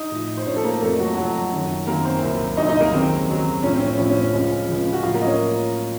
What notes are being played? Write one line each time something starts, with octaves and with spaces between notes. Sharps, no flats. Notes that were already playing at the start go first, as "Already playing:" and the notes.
Already playing: D#4 D#5
A2 F3
C5
A2 F3 C#4 C#5
A4
A#3 A#4
F2 C3 F3 A3 A4
F#3 F#4
F2 C3 F3 F#3 F#4
F#2 D#3 F#3
F#2 D#3 F#3 A#3 A#4
C4 C5
C2 A#2 F#3
C2 A#2 F#3 D#4 D#5
D#4 D#5
A#3 A#4
D#2 C#3 F#3 C4
D#2 C#3 F#3
A2 F3 C#4
C4
C#4
A2 F3 C#4
C#4
C#4
C#2 C#3 F3
C#2 C#3 F3
F#4
A2 F3 F#3 F4
A#3 A#4
D#5
C#4 C#5